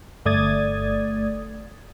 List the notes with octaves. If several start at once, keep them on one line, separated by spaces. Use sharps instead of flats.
G1 A3 D5 D#6 G#6 A6